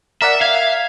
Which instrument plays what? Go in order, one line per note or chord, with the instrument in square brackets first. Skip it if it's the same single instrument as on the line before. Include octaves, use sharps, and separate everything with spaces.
[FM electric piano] A#4 D5 F#5 [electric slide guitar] E5
[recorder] E5 [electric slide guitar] F5 [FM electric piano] G#6